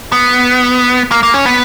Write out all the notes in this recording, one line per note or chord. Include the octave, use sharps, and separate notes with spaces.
B3
A#3
A#3
C#4
B3